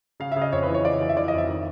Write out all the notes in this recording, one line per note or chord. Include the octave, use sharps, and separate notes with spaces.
C#3 F5
C#3 E5
D#5
F2 C#5
B4
E3
C#5
C#3 D5
C#5
E3
E5
E3 D5
D#5
F2 E5
D#3